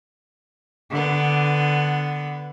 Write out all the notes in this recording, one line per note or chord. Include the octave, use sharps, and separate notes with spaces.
D3 B3